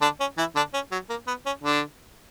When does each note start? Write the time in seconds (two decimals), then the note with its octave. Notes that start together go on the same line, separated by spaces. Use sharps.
0.01 D3 D4
0.20 C#4
0.38 E3 E4
0.55 D3 D4
0.74 C#4
0.92 F#3
1.10 A#3
1.27 B3
1.46 C#4
1.64 D3 D4